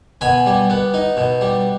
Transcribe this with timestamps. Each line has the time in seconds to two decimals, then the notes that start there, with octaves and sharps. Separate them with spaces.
0.21 B2 G#5 B5
0.46 G3
0.70 B3
0.94 D#4
1.17 B2
1.41 G3